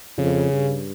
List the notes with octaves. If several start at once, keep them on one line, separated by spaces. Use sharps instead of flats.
F2 C#3
G2